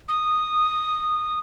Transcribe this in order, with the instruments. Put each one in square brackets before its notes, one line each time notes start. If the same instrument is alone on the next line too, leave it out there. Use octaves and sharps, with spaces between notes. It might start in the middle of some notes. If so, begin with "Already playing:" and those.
[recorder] D#6